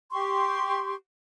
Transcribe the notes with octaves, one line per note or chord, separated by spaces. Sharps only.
G4 C6 C#6